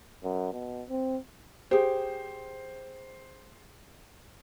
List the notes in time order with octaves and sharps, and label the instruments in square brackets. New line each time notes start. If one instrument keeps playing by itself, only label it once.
[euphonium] F#2
B2
C4
[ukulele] G4 G#4 [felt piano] C5